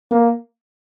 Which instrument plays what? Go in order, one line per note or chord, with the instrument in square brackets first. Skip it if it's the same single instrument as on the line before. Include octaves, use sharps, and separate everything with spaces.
[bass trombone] A#3